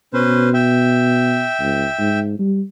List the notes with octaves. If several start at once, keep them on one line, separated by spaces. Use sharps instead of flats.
B2 C#4 B4 C5
E5 G5
C#2
G#2
G3